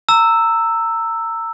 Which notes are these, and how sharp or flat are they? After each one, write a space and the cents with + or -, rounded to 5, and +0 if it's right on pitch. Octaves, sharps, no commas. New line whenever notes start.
A#5 -25 E6 +0